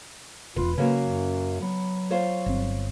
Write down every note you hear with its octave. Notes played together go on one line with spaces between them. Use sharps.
E1 F4 B4
C#3 F#3 A#3 C#4 B4
F#2
F#3 B3
F4 C5 C#5
G1 C4